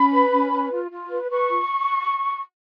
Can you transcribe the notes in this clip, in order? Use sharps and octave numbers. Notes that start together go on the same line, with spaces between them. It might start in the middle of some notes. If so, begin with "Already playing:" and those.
Already playing: C#4 B5
B4
C#4
B4
F4
F4
B4
B4 C#6
F4